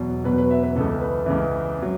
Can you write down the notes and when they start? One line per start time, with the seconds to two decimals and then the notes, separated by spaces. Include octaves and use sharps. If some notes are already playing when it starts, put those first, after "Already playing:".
Already playing: E2 B2 F#3
0.24 E2 B2 F#3 B4
0.38 B4
0.51 E5
0.63 B4
0.75 C#2 C#3 E3 A4
1.01 B4
1.26 C#2 C#3 E3
1.82 F#3